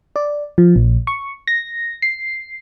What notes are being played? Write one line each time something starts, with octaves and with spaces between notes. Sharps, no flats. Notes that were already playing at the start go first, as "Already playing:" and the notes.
D5
F3
A#1
C#6
A#6
C7